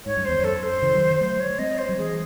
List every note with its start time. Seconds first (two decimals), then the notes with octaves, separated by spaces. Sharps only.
0.06 G#2 C#5
0.17 F#2
0.25 E2 C5
0.39 F#2 A4
0.63 C5
0.82 C#3 E3
0.95 D#3 F#3
1.21 F#3 A3 C5
1.40 C#5
1.59 G#3 C4 D#5
1.78 C5
1.89 F#3
1.98 E3 G#3 G#4